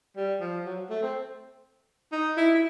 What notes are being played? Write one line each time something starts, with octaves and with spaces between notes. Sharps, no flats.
G3
F3
F#3
A3
C4
D#4
E4
E4